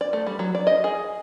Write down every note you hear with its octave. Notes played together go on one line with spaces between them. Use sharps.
D5
A3
G3
F#3
D5
D#5
G#4